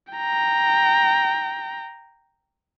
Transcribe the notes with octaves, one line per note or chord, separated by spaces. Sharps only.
G5 A#5